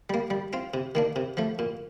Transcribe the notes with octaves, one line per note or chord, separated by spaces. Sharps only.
G3 A#3
G3
C4 F4
C3
D#3 A#3 D4
C3
F3 A3
A#2